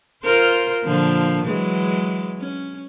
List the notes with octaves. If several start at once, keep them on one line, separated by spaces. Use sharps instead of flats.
F4 A#4 C5
A#2 D3 F3
E3 F#3 G#3
C#4